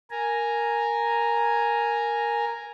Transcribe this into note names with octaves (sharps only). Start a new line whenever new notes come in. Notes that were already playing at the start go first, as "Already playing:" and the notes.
A#4 G#5 A#5